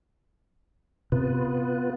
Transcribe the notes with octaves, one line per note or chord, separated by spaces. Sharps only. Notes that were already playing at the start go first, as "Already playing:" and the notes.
C3 B3 F4 B4